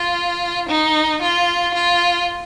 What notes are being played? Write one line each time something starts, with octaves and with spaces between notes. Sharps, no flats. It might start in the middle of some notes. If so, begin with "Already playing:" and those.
Already playing: F4
D#4
F4
F4